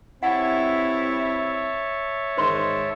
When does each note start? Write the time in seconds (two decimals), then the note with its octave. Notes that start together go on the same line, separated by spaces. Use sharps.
0.23 G2 C4 E4 C#5 E5 F#5 A5
2.38 G#2 D#3 C5 C6